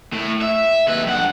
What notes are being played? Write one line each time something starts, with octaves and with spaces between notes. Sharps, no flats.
A2
E5
D#2 B4
G2 F#5